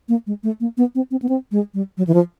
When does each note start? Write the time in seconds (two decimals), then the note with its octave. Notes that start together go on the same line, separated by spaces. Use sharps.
0.09 A#3
0.27 G#3
0.43 A3
0.60 A#3
0.77 B3
0.95 C4
1.11 C4
1.22 B3
1.29 C4
1.52 G#3
1.74 G3
1.97 F#3
2.07 E3
2.14 F3